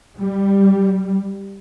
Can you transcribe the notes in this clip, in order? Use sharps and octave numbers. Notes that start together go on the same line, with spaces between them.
G3